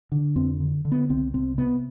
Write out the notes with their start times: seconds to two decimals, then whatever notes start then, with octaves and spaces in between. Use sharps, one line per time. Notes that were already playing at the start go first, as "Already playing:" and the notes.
0.12 D3
0.36 F2 C4
0.60 D3
0.85 D3
0.92 B3
1.10 C2 C4
1.34 C3 C4
1.58 C3 B3